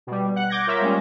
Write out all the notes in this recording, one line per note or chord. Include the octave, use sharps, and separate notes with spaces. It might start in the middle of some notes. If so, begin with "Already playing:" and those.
B2 G3
F#5 F#6
D6 G6 G#6 A#6
F4 A#4 C#5 E5
G3 G#3 A#3 C#4